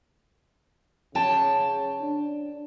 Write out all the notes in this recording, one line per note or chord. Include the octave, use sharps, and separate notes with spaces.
C#3 C#5 G5 A5
D4